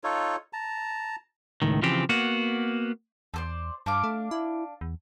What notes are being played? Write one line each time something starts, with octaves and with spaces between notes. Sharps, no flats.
D#4 F4 A4 C#5
A5 A#5
C#2 A2 D#3
C#3 E3 F3 C4 G4
A#3 B3 F#4
E2 A4 C5 D5
G2 D4 F5 D6
A3
E4
E2